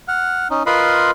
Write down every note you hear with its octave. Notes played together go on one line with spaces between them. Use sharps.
F#5 F6
C#4 D#4
F4 A#4 B4 D#5 B5 C6